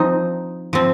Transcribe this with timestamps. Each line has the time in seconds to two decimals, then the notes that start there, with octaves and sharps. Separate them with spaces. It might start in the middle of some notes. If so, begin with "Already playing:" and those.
Already playing: F3 C4 D#4
0.73 F3 C4